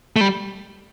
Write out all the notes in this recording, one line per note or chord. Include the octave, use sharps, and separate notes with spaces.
A3
G3